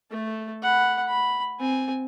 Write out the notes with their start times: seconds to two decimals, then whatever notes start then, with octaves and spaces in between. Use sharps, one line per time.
0.11 A3 A4
0.62 F#5 B5
1.06 B5
1.60 C4 G#5